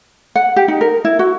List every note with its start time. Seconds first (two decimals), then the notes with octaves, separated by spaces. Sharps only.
0.36 F#5
0.56 G4
0.68 D#4
0.81 A#4
1.05 E4
1.19 F#4